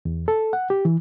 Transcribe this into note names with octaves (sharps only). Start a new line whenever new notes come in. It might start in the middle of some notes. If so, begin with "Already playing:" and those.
E2
A4
F#5
G4
E3